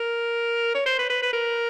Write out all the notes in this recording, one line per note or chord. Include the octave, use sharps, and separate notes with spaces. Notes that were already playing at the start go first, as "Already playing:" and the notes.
Already playing: A#4
C#5
C5
B4
B4
B4
A#4